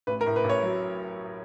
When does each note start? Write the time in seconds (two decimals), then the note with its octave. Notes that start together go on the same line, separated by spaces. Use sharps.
0.07 A1 B4
0.21 A#4
0.26 A2
0.36 B4
0.44 A1
0.49 C#5
0.63 F#3